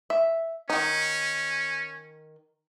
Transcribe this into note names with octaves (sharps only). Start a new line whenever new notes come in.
E5
D#3 C#4 D#4